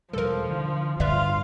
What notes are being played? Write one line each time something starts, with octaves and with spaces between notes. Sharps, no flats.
E1 F3 G3 A4 A#4
D3 E3
D1 G2 D3 F4 B4 D5 E5 F5